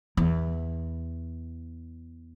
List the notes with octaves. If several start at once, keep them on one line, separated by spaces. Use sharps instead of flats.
E2